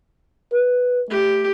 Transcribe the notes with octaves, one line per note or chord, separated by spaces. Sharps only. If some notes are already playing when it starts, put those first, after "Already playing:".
B4
A3 G4